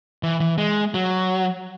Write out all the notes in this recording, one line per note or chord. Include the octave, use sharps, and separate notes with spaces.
E3
E3
G#3
F#3